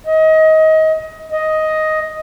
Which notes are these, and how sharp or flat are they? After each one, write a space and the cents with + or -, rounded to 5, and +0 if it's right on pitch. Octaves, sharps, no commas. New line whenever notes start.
D#5 +25
D#5 +5